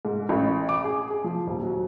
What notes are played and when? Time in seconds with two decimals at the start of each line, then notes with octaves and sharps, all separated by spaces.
0.05 G#2
0.29 A1
0.69 D6
0.84 G#4
1.10 G#4
1.24 F3
1.46 D#1
1.63 F#3